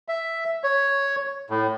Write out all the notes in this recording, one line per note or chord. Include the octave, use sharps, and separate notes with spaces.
E5
C#5
A2